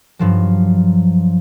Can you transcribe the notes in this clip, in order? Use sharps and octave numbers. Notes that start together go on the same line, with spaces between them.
G2 F3 F#3